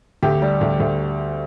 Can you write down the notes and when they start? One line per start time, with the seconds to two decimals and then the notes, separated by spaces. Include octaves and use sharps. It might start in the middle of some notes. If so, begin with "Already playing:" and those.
0.23 D2 G4
0.42 G3
0.61 D2
0.80 D2